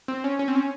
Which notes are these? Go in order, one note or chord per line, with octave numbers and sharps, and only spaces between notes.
C4
C#4
C#4
C4
C#4